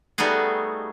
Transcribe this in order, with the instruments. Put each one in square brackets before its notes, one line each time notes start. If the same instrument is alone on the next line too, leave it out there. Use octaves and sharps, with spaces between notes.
[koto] G3 A3 B3 D#4 F#4 G#4